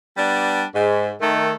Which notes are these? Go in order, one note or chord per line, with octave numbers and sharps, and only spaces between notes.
G3 B3 D4
G#2
D#3 A3